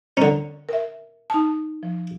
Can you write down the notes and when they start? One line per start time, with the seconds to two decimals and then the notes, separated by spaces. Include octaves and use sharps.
0.17 D3 C#4 A#5
0.69 A#4 E5
1.30 D#4 A5
1.83 F3